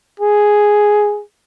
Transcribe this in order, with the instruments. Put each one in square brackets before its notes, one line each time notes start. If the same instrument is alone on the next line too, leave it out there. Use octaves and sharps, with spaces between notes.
[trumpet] G#4